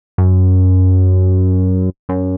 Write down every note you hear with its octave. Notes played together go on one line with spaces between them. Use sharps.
F#2
F#2